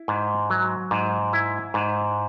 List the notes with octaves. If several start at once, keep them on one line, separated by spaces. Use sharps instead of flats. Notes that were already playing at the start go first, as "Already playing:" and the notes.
Already playing: E4
G#2
F#3
G#2
E4
G#2